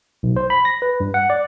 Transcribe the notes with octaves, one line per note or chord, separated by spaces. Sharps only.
B1
C5
B5
A#6
B4
G2
F#5
D5